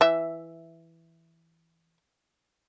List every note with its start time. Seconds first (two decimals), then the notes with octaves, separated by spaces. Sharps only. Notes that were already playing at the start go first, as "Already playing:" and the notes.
0.01 E3 E5